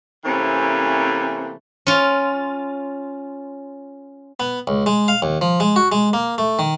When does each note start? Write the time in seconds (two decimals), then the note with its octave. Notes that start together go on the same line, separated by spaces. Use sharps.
0.25 C3 E3 A3 A#3 C4 C#4
1.87 C#4 F4
4.40 B3
4.67 C#2
4.86 G#3
5.08 F5
5.22 D#2
5.41 F3
5.60 G#3
5.76 F#4
5.92 G#3
6.13 A#3
6.38 A3
6.59 D#3